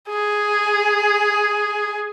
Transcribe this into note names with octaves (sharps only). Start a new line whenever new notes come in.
G#4